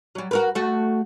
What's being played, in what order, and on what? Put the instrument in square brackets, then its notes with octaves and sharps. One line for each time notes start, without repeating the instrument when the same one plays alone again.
[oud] F#3 G3
F#4 A#4 B4
A3 F#4